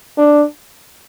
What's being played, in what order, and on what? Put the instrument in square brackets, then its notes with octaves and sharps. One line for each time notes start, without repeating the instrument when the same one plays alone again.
[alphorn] D4